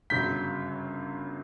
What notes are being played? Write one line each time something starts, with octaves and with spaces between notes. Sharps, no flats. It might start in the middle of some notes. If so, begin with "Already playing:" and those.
G1 F#2 C#3 F#3 G6 B6